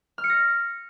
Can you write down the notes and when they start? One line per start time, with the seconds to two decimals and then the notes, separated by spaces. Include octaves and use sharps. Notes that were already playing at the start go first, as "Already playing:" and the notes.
0.18 F6
0.24 C#7
0.30 A#6